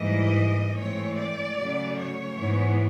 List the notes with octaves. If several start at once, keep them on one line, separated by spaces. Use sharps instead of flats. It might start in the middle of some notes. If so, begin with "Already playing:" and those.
Already playing: G#2 E3 G3 A#3 D#5
A2 E3 G#3 C4 C#5
D5
C#3 F#3 A3
C#5
G#2 E3 G#3 B3